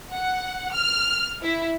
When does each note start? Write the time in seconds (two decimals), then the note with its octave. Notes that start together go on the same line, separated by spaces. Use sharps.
0.13 F#5
0.74 F6
1.43 E4